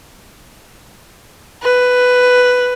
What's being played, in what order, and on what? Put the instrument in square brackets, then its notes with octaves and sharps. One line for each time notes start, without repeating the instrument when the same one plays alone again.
[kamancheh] B4